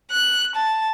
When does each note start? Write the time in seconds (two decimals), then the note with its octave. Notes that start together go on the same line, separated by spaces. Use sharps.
0.12 F#6
0.56 A5